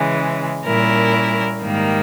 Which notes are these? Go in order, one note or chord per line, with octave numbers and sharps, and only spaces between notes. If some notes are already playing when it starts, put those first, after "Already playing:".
Already playing: C#3 E3 G#3
A#2 G3 C#4 E4 A#4
G#2 D#3 G3 A#3